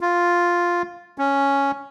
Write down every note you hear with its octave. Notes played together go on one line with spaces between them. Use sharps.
F4
C#4